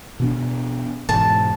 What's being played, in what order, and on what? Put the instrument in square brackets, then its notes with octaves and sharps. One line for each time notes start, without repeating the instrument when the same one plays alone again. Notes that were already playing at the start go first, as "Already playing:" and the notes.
[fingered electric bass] B2 B3 D4
[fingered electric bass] E1 G#2 [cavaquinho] A5